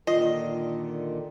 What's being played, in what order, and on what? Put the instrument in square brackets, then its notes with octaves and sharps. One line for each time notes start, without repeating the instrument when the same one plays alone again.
[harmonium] A#2 D3 D#3 [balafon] F4 [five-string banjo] D#5